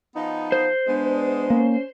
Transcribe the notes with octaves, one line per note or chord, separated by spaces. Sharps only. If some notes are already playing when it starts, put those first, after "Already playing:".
F3 B3 D#4
C5
G#3 B3 D4
A#3 C#4